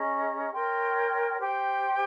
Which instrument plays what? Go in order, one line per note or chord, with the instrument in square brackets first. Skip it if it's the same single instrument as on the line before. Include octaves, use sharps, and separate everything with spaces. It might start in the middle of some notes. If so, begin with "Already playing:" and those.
Already playing: [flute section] C#4 G#4 D#5 A#5
A#4 C#5 G5 C6
G4 C5 G5